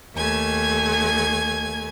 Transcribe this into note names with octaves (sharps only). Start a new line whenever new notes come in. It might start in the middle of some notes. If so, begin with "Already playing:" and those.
D#2 A3 G#5 G#6